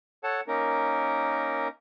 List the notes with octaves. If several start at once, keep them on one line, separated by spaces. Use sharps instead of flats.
A4 C#5 F#5 A5
A#3 C#4 D#4 A#4